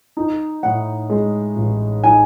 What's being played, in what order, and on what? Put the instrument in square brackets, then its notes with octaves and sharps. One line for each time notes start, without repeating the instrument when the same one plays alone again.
[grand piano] D#4
[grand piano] A2 [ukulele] F#5
[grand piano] G#3
A1
[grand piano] D#4 [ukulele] G#5